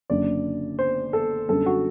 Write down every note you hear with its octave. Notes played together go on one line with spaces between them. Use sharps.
F#1 F#2 D3 F#3 D5
C5
A4
F#2 D3 G3 A4
F#4